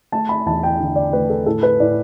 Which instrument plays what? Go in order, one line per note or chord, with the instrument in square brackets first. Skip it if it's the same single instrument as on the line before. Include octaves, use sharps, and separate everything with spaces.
[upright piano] A3 A5
B5
E2 A5
G5
D3
D5
A3 B4
A4
A2 A4
B4
A2 D5